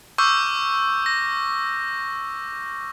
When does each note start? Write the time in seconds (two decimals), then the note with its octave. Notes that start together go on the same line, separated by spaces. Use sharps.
0.18 C#6 D6 E6 F6 G6
1.06 A#6